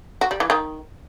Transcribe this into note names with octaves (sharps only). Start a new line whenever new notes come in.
F#4
G3
E3
D#3